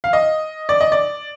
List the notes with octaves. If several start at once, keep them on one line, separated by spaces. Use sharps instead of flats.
F5
D#5
D5
D#5
D5